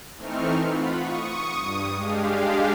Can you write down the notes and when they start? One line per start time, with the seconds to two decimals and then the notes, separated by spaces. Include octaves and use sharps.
0.17 E3 A3 C4 D#4 C#6 F6
0.68 F4 F#5 B5
1.00 C#6 D#6
1.57 G2 D#6
1.94 G#3 D4 G4 F5